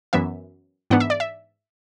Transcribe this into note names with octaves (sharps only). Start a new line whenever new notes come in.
F#2 E3 B3 E5
G#2 E3 B3 D4 F#5
E5
D5
E5